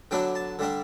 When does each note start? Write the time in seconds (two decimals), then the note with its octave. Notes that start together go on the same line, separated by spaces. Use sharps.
0.11 D3 F#3 B3 D4 G5
0.35 A5
0.59 D3 G3 D4